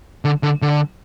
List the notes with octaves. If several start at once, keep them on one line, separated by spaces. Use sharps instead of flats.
D3
D3
D3